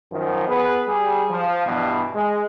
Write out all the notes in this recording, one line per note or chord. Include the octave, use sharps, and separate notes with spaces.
F#2 D#3 F3
B3 G#4 B4
G3 G#4
F3
G2 B2 E3 G3
G#3